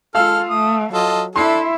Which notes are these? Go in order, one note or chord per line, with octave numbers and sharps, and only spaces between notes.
G#3 F4 A4 F5 E6 F6
A3 D#6
F#3 F4 A4 D#5
D4 E4 A4 E5 C6 C7